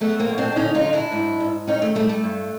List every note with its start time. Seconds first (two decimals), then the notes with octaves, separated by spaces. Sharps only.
0.01 F#2 A3 B3
0.19 A#3 C4
0.29 F#2
0.38 C4 D4
0.52 D4
0.56 D3 C#4 D#4
0.75 D#4 F4
0.84 F#3
0.93 D4 E4
1.12 G#2
1.40 G#2
1.67 D#3 C#4 D#4
1.82 A3
1.95 G3 A3
2.09 A3
2.23 G2